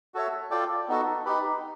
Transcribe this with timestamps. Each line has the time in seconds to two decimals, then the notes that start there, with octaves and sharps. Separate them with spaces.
0.14 F#4 A4 C#5 E5
0.51 F4 A4 D5 G5
0.88 B3 D#4 F#4 A4
1.26 D#4 G4 B4